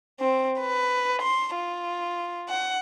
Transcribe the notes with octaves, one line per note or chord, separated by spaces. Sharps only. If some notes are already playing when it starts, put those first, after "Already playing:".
C4
B4
C6
F4
F#5